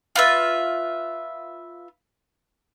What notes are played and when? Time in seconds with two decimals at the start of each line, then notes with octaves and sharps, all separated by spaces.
0.16 F4 B4 E5